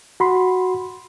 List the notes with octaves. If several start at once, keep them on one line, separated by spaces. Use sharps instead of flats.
F#4 B5 C6